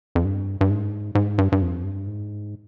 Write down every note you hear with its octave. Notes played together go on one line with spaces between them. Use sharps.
F2
G2
G2
G#2
G#2
G2
G2
F2
G2
G#2